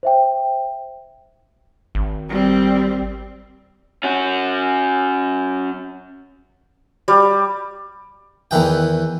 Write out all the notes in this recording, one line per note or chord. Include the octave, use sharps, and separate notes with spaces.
C5 E5 G5
G#1
G3 C4
C#4 F#4
G3
E2 D#3 E3 G5